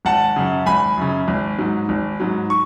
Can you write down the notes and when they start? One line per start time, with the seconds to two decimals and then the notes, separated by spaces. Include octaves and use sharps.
0.05 G#1 F#5 A5
0.36 F#2 C#3
0.66 G#1 G#5 B5
0.97 F#2 C#3
1.28 G#1
1.58 G#2 F#3
1.89 G#1
2.20 G#2 F#3
2.50 C#6